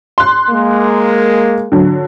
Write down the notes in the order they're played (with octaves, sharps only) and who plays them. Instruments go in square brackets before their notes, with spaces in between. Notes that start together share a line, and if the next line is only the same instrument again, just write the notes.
[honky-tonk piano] C6 F#6
[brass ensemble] G#3 A#3
[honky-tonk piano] D3 F#3